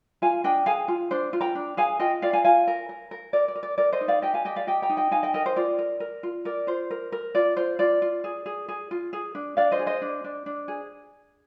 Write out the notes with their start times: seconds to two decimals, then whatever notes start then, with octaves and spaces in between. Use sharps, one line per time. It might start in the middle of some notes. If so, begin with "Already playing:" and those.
0.22 F4 F5 G#5
0.44 D4 D#5 G5
0.66 G#4 F5 G#5
0.88 F4
1.11 D4 C5
1.33 F4
1.41 G5 A#5
1.55 D4
1.77 G#4 F5 G#5
2.00 F4 D#5 G5
2.22 F4 D5 F5
2.33 F5 G#5
2.45 F4 F5 G#5
2.67 A#4
2.89 A#4
3.11 A#4
3.33 A#4 D5
3.48 D5
3.55 A#4
3.63 D5
3.78 A#4 D5
3.92 C5 D#5
4.01 D#4
4.08 D5 F5
4.22 G4 D#5 G5
4.34 F5 G#5
4.45 G4 D#5 G5
4.56 D5 F5
4.67 G4 D#5 G5
4.82 G5 A#5
4.90 D#4
4.97 D#5 G5
5.11 D#4 F5 G#5
5.23 D#5 G5
5.34 A#4 D#5 G5
5.46 C5 D#5
5.56 F4 D5
5.79 A#4
6.00 A#4
6.23 F4
6.45 A#4 D5
6.67 F4 C5
6.91 A#4
7.12 A#4
7.35 F4 D5
7.57 F4 C5
7.79 F4 D5
8.02 F4
8.24 G#4
8.46 G#4
8.68 G#4
8.91 F4
9.13 G#4
9.35 D4
9.57 D4 D5 F5
9.72 C5 D#5
9.79 G#4
9.86 C5 D#5
10.02 D4
10.24 D4
10.46 D4
10.68 G#4